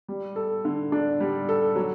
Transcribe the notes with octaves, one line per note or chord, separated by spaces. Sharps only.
G3
A4
D3
D4
G3
A4
F#3